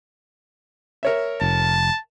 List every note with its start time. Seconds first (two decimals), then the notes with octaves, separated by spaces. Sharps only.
1.03 A#4 C#5 E5
1.41 F1 A5